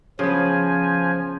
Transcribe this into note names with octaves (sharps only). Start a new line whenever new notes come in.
C#3 F3 B3 G#5